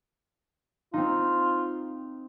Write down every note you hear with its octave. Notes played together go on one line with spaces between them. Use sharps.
C4 D#4 F4